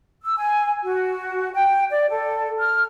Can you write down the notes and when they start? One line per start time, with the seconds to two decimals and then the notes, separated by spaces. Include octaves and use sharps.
0.24 E6
0.38 G#5
0.83 F#4
1.54 G5
1.91 D5
2.09 A4
2.59 F6